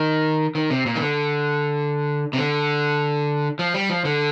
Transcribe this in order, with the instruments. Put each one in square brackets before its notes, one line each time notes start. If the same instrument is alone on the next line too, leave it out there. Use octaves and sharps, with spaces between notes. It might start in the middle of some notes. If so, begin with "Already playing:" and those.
Already playing: [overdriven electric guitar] D#3
D#3
C3
A#2
D#3
D3
C3
D3
F3
G3
F3
D3